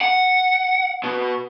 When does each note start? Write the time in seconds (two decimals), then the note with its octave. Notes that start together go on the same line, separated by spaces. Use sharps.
0.01 F#5
1.04 B2